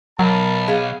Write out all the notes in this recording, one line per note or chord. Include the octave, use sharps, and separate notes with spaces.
B1 F#3 A#4 A5 B5
B3 G#4 F5